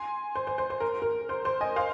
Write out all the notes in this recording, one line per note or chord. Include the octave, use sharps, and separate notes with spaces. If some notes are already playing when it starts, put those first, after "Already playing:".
Already playing: G#5 C6
C5
C5
C5
C5
A#4
A#4
C5
C5
D#5 G#5
C5 F5